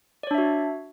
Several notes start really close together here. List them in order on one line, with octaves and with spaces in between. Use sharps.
D5 C#5 D4 E5 F#4